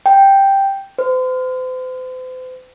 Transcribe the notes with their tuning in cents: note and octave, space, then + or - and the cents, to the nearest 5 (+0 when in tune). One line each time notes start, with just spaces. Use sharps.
G5 +0
C5 -40